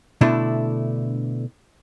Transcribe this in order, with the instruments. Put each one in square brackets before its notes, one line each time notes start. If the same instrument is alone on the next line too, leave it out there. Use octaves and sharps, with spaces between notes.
[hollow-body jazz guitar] B2 D3 A3 D4 E4